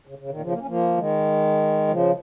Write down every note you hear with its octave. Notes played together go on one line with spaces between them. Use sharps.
C#3
C#3
A#2 D#3
C#3 F3
A#3
C#4
F3 A#3
D#3 G#3
C#3 F3